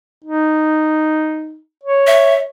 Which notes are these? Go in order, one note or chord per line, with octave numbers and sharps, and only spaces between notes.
D#4
C#5
E5